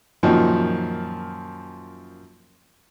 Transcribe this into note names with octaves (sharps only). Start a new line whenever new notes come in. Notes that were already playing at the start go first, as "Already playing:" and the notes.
F#2 A#2 D#3 F3